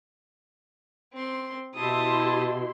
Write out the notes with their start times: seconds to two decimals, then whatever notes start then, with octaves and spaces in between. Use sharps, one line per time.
1.13 C4 C6
1.75 B2 E4 G4 A5 C6 D#6